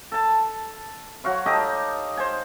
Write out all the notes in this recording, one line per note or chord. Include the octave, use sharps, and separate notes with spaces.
A4 A5
F#3 F#4 F5 C#6
D#4 G4 A4 D#5
C5 G#5